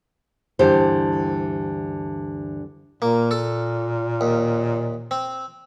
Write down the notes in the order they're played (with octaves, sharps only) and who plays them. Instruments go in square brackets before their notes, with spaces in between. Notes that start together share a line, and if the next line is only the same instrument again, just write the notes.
[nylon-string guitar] D2 G2 D3 E3 G4 C5
[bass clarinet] A#2 [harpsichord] A#3
[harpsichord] A4
D#2
C4